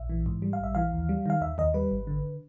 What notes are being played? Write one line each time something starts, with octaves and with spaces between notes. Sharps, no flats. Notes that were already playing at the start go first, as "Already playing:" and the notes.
Already playing: A#1 E5
E3
G#2
G3
F5
A#1 E5
E3 F5
D#2
G3
D#3 F5
D#2 E5
D#2 D#5
G3 B4
G#1
D3